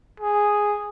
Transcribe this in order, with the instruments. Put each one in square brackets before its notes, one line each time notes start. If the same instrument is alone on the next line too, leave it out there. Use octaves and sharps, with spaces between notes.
[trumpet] G#4